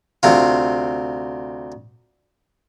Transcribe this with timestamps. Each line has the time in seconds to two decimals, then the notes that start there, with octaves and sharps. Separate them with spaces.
0.23 D2 C3 F4